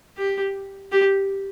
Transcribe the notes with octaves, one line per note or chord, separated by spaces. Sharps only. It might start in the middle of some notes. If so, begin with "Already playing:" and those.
G4
G4